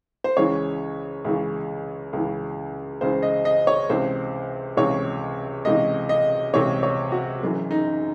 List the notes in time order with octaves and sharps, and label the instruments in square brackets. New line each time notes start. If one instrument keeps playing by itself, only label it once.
[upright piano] C5
C#2 C#3 E3 C#5
C#2 C#3 E3
C#2 C#3 E3
C#2 C#3 E3 C5
D#5
D#5
C#5
C#2 C3 E3 C5
C#2 C3 E3 C#5
C#2 C3 E3 D#5
D#5
C#2 C3 E3 C#5
C#5
F#4
F#1 F#2 E3
D#4